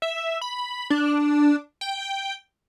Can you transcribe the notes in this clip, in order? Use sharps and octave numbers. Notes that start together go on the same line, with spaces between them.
E5
B5
D4
G5